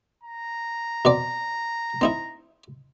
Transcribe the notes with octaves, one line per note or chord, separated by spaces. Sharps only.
A#5
B2 C4 D5
C4 D#4 E4